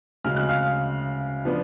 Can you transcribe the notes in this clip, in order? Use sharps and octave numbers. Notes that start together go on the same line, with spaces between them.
D2 C#3 G#3 F6
F#6
F5 F6
F3 B3 D4